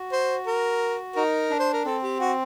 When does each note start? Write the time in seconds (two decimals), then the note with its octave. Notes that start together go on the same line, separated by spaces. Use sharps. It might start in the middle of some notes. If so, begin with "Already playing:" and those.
Already playing: F#4
0.12 C5
0.47 A#4
1.16 D#4 A#4
1.50 D4
1.59 C5
1.73 A#4
1.85 C4 A4
2.03 G4
2.20 F#4